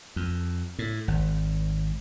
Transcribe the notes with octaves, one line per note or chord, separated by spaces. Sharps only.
F2
A2
G#1